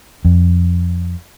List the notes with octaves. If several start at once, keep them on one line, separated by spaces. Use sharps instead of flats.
F2